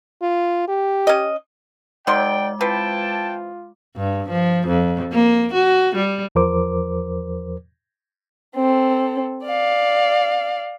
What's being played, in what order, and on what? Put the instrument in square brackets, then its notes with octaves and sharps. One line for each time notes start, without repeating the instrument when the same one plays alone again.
[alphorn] F4
G4
[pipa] C#4 D#5
[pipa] D#3 F#3 C6 [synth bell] G#3 D6 [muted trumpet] D5 [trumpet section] G5
[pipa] E3 C4 B4 [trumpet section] E4 G5 A5 [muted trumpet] F4
[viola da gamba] G2
F3
F2
A#3
F#4
G3
[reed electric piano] E2 F3 A#4 C5 D6
[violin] C4 A4
D5 F5